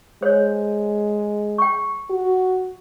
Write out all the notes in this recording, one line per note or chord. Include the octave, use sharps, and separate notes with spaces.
G#3 C5 C#5
G5 C#6
F#4